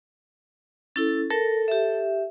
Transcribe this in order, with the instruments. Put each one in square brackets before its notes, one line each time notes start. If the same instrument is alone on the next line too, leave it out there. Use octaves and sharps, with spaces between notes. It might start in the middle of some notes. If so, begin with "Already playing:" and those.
[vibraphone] C#4 E4 A4 [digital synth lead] A6
[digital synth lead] A4 [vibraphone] A#4
[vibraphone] G4 E5